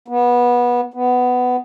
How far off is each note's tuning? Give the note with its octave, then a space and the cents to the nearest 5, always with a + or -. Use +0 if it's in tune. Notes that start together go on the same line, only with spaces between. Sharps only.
B3 -20
B3 +15